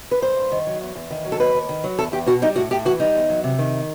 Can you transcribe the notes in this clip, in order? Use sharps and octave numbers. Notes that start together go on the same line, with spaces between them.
B4
G2 C5
G2
D#3
F#3
E2
E2
D#3
F#3
A4
D#2 B4
D#2
D#3
F#3
E2 A4
E2 G4
B2 F#4
G3 D#4
A2 F#4
A2 G4
E3 F#4
G3 D#4
E2
F#3
C3
D#3